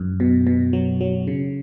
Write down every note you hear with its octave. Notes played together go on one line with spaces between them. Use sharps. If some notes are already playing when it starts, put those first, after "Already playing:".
Already playing: F#2
B2
B2
F#3
F#3
C#3